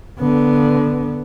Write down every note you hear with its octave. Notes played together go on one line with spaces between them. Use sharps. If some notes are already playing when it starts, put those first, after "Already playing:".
D3 B3